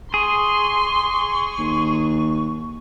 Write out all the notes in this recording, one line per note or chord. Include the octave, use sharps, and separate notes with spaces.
G#4 C6 C#6
D#2